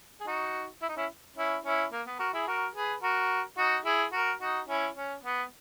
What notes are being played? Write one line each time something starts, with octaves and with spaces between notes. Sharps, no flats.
G#4
D#4 F#4
E4
D#4
C#4 E4
C#4 E4
C#4 E4
A#3
B3
F#4 A#4
E4 G#4
F#4 A#4
G#4 B4
F#4 A#4
D#4 F#4
E4 G#4
F#4 A#4
D#4 F#4
C#4 E4
C#4
B3